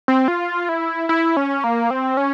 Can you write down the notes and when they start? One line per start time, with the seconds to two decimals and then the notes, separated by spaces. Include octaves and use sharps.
0.08 C4
0.28 F4
0.69 E4
1.09 E4
1.37 C#4
1.64 A#3
1.91 C4
2.17 C#4